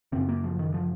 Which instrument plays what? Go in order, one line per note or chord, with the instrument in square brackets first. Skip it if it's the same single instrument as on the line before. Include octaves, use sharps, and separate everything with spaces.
[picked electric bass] F#2 C#3 C4
A#3
F3
D#3
F3